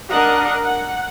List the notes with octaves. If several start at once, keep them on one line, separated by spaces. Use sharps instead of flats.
D4 A#4 D#5 F#5
F#5